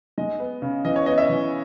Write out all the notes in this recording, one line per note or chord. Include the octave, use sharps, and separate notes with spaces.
G#3 D#5
B3
C#3
E3 D#5
C#5
B3 D#5
E5
E3